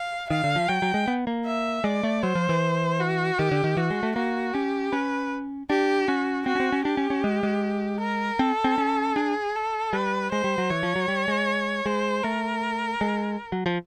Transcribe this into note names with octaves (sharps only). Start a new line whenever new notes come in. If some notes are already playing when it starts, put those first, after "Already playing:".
Already playing: F5
D#3 F5
D3
F3
F#3 G5
F#3
G#3
B3
A#3
E5
G#3 D5
A3
F#3 C5
F3
E3
F#4
D#3 G4
D3
D#3
E3 F#4
G#3
A3
A#3 F#4
C#4 G4
C#4 B4
D4 G4
C#4 F#4
C4 F#4
C#4
C4
C#4
D4 G4
C#4
C#4
G#3
G#3
A#4
C4 A4
C4
C#4
D4 G#4
A4
G3 B4
G#3 C5
G3
F#3
E3 C#5
F3
F#3
G3
G#3
G#3 C5
A3 A#4
G#3
F#3
F3